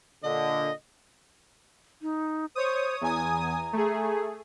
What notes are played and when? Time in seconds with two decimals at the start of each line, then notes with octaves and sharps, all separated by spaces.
0.23 A#2 D3 D#5
2.02 D#4
2.55 C5 C#5 D#6
3.01 E2 G#5 A#5 D#6
3.73 A3 G#4